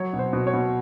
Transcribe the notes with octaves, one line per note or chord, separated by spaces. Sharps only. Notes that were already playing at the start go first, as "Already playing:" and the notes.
Already playing: F#3 C#5
B2
C5
B2
C#5
B2